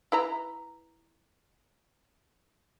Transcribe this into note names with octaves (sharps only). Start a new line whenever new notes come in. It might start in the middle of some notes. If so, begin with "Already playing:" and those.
E4 B4 A#5